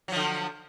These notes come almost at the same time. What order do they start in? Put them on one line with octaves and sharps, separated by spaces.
F#3 F3 D3